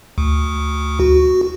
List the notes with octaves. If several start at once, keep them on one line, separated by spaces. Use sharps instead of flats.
D2
F#4